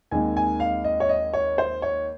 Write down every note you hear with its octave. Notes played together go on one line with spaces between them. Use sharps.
D#2 D#3 G#3 C4 D#4 G#5
G#5
F5
D#5
C#5
D#5
C#5
C5
C#5